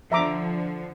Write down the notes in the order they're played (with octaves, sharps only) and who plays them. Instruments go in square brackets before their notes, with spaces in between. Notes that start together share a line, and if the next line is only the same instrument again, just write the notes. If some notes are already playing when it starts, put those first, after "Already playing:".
[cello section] D3 F3 [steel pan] E5 A#5 D6